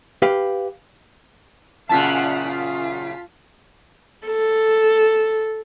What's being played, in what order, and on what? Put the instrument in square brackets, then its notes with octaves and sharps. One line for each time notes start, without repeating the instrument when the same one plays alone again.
[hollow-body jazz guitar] G4 B4 F5
[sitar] F#2 A#2 C#3 [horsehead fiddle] F4 F#5 [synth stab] A5 B6
[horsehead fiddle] F4
[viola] A4